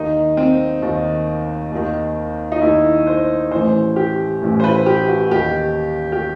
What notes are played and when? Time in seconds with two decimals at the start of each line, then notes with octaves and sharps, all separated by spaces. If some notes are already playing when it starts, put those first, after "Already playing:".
Already playing: D#2 D#3 D#4
0.37 C4
0.82 D#2 D#3
1.71 D#2 D#3
2.52 D#4
2.62 D#2 D#3 E4
3.07 C5
3.52 A1 A2 E3 C5
3.96 G4
4.42 A1 A2 E3
4.60 C5
4.64 B4
4.86 G4
5.08 F#4
5.31 D#2 D#3 G4
6.12 G4